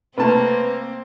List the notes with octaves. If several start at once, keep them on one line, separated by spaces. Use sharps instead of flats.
C2 A3 A#3 C4 B4 A5